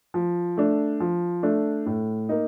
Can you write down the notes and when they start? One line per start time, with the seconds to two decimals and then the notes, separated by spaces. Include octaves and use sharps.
0.14 F3
0.57 A3 D4
1.00 F3
1.43 A3 D4
1.86 A2
2.29 A#3 D#4